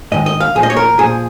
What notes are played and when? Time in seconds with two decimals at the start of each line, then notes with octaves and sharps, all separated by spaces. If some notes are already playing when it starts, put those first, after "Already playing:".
0.12 G#2 D#3 D#5
0.26 D#5
0.40 F5
0.55 A#2 F3 G#4
0.63 D#5
0.70 C#5
0.77 A#4
0.99 A#2 F3 G#4